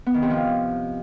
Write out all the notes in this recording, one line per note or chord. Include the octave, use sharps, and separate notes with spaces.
B3
D#3
C3
F3